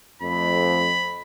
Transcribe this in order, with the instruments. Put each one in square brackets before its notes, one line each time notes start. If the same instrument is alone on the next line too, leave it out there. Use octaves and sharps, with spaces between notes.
[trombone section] F2 A3 [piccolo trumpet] B5